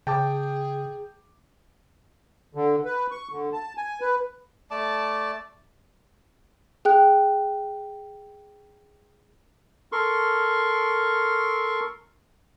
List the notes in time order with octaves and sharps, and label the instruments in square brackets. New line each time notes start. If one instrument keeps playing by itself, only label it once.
[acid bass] C#3 [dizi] G#4 [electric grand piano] G5 A5 D6
[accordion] D3
B4
C#6
D3
A5
G#5
B4
[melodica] A3 D5 A5 D6
[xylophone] G#4 G5 F#6
[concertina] A4 A#4 C6 C#6